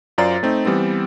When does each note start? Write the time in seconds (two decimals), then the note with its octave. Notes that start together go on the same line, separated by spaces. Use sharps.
0.18 F#2 F4 C5 D5 A#5 A6
0.43 A3 C4 D#4
0.65 E3 G3 B3 C4